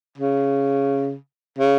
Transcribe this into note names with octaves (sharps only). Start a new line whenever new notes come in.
C#3
C#3